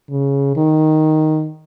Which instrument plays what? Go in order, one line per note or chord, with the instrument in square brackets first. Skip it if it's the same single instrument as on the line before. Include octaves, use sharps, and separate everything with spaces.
[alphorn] C#3
D#3